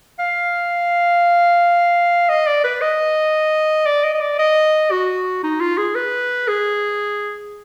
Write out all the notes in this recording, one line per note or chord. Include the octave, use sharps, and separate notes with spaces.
F5
D#5
D5
B4
D#5
D5
D#5
D#5
D5
D#5
F#4
D#4
F4
G#4
B4
G#4